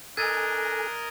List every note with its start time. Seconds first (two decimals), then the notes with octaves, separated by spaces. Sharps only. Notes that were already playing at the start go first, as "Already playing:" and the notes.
0.17 D4 A4 A#4 D#5 G#5 G#6 A6